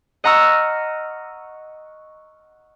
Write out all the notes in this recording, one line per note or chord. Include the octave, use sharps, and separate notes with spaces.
D#5 F#5 A#5 C#6 E6 F6